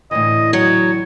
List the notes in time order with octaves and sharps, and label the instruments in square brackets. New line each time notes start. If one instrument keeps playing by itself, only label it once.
[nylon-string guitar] A2 D3 E3 [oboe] D#5
[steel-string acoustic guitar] F#3 [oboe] C#5